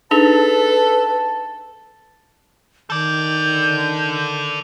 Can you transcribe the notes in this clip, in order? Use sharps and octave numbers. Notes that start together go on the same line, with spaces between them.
D4 D#4 G#4 A4 B4 A5
D#3 A4 D5 G6